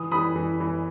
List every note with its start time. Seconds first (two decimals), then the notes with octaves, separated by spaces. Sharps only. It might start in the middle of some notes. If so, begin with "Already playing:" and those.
Already playing: E3 D#6
0.11 E3 B5 D#6
0.36 E3
0.60 E3